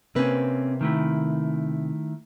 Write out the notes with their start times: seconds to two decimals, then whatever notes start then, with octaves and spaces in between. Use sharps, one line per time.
0.15 C3 A#3 C4 C#4 B4
0.81 D#3 A3 E4